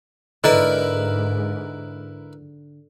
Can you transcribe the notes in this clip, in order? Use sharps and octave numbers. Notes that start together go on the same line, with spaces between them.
G#2 D3 E4 A#4 B4 D#5